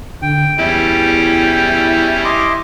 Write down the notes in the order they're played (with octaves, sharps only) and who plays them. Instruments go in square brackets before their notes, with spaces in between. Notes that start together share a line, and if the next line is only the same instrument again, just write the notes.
[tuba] D3 [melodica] G5
[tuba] E2 [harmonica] G3 C#4 E4
[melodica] D#5 C6 D6